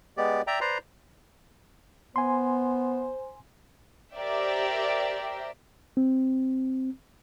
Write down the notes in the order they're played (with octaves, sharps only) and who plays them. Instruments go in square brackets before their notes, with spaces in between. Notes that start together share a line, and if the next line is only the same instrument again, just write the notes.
[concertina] G#3 B3 G4 D5
D5 E5 G5 A#5
B4 C5 D5 A#5 C6
[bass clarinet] B3 [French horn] C5 [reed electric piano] G#5 C6
[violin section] G4 A#4 C5 D5 E5 G5
[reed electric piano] C4